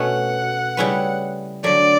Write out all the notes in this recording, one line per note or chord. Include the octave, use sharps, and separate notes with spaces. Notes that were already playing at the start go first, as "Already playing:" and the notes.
Already playing: B2 A3 C#4 F#5
C#3 G3 C#4 E4 B4
D3 F#3 A3 D5